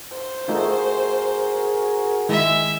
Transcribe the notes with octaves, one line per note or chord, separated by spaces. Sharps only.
C5
A3 D#4 F4 F#4 G#4 A#4
D#3 G#3 E4 E5